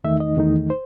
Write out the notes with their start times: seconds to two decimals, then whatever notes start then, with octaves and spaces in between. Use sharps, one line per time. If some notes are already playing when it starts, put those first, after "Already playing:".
0.04 E2 D#3 A3 D#4 E5
0.20 D#5
0.37 E2 D#3 A3 D#4
0.70 C5